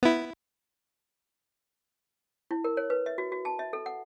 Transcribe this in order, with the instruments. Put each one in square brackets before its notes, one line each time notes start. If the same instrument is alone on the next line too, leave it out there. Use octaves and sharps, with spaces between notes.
[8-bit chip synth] B3 E4
[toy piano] E4
A#4
C#5
B4
E5
F#4
F#4
A5
E5
A4
F#5